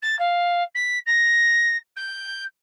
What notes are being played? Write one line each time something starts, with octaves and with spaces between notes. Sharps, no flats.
A6
F5
B6
A#6
G6